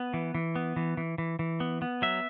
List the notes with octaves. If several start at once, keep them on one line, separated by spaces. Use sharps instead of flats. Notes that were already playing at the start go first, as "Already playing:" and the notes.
Already playing: B3
E3
E3
B3
E3
E3
E3
E3
B3
B3
F#3 E5